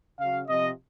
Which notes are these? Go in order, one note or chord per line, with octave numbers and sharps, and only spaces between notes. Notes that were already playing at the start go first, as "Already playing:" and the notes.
C#3 F#3 F5
C3 F3 D#5